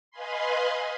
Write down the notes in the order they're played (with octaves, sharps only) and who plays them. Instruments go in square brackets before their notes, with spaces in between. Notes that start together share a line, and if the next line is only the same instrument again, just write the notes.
[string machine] B4 D#5 F5 G#5 B5 C6